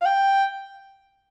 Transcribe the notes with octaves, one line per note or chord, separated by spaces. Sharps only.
F5
G5